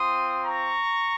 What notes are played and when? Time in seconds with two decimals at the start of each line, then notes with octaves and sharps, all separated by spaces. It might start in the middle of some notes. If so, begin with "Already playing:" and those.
Already playing: C4 F4 C6 D#6
0.43 A#5 C#6